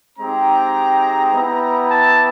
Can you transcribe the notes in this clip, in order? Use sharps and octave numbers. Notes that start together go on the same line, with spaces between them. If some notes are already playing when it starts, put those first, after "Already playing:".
G#3 C4 D#4 G4 A#5
B3 E4 G4
A5